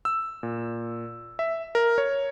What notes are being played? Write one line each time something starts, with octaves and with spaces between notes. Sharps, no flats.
E6
A#2
E5
A#4
C#5